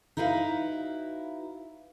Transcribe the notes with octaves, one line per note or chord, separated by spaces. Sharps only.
D#4 E4 F#4 B4 F5